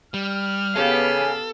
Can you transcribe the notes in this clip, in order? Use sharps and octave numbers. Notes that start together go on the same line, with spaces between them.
G3 F6
C#3 B3 G4 A4 F5 G#5